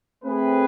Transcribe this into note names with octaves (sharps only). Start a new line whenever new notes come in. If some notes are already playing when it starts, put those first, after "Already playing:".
A3 C4 G#4 B4